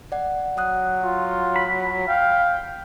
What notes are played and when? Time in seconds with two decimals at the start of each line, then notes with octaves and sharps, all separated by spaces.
0.12 D5 F#5
0.57 F#3 F#5 D#6 F#6
1.03 F4
1.56 B5
2.08 F5 G5